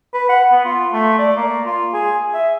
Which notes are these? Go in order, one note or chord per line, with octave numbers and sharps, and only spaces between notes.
B4
F#5
B3
F4
A3
D5
A#3
F4
G#4
E5